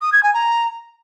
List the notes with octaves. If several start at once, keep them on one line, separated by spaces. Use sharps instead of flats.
D#6
G#6
G#5
A#5